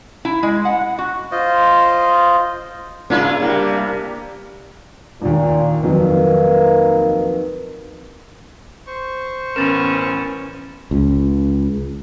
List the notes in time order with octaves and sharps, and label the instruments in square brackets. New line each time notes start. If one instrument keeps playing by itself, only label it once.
[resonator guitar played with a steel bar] E4
G#3
F#5
F#4
[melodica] F4 C5 D#5
[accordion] C#3 [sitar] A#3 E4 F4 [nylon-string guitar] D4
[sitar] C3 [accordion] G3 A#3
[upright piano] A#1 D#2 [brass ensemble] A#2
[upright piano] F2 D#3 F#3 [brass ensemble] A#3 D#4 B4
[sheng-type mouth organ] C5 C#6
[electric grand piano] A1 B3 A#4 [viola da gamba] C#4 [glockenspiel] B5 A6 E7
[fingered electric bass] C#2